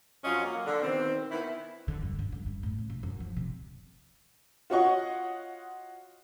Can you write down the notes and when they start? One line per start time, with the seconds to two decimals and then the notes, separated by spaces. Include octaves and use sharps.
0.25 F2 F#3 C#4 F4 D#5
0.44 F#3 A#3
0.67 D3
0.82 B2 D#3 C4
1.31 D#3 B3 E4
1.88 D3
2.03 G2
2.19 D3
2.32 G2
2.46 G2
2.63 A2
2.78 C#3
2.90 B1
3.03 F#2
3.20 F3
3.37 C3
4.70 F4 F#4 C#5 D#5 F#5 C#6